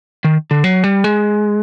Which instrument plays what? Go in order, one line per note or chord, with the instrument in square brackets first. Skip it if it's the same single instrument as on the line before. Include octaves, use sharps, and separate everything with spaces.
[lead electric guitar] D#3
D3
F#3
G3
G#3